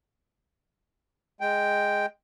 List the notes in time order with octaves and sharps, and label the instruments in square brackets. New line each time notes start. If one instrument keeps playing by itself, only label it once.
[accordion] G#3 G5